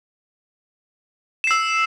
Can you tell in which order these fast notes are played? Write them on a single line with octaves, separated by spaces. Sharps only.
E7 C7 E6